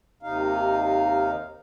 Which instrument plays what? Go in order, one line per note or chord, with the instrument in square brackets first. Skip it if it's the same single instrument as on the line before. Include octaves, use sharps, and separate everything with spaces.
[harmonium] D#2 C3 D#4 F5